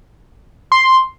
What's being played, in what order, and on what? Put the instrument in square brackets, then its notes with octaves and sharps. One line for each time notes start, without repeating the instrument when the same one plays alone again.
[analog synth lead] C6